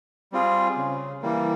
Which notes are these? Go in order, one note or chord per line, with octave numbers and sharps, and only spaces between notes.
G3 C4 F4 G#4
C#3
E3 G3 A#3